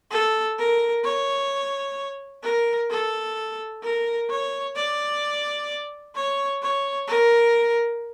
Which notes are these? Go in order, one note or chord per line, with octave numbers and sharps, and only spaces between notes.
A4
A#4
C#5
A#4
A4
A#4
C#5
D5
C#5
C#5
A#4